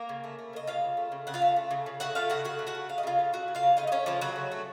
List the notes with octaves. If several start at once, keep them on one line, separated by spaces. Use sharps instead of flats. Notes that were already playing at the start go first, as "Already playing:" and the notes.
Already playing: A#3 A#4
C#3
A3
A3
C#3 D#5
C#3 F4 F5
A3
A3
C#3
C#3 F#5
F4 F5
A3
A3
C#3
C#3
A3 F#4 F#5
A3 F4 F5
C#3 F#4 F#5
C#3 F#4 F#5
A3
F#4 F#5
A3
C#3 F5
D#5
C#3 F4 F5
A3
A3 F#4 F#5
C#3
F4 F5
C#3
A3 D#4 D#5
D#5
A3 C#4 C#5
C#3 F3 F4
C#3 F#3 F#4
A3
A3